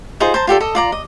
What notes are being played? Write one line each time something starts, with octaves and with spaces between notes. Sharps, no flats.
D#4 F4 G#4 C5
C5 A5 A#5
F4 G4 A4 D5
A4 D#5
F4 D5 A#5
D#5